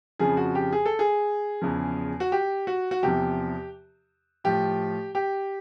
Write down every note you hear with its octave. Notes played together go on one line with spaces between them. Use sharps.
F2 C#3 F3 G#4
F#4
G4
G#4
A4
G#4
E2 C#3 F3
F#4
G4
F#4
F#4
E2 C3 F3 G4
A2 F3 G4
G4